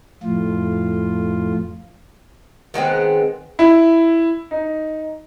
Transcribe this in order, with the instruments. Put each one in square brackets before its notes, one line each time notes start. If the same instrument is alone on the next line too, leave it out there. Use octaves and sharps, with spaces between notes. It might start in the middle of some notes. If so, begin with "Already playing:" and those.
[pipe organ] F2 A2 F4
[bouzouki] D#3 G#3 B3 C4
[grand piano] E4
D#4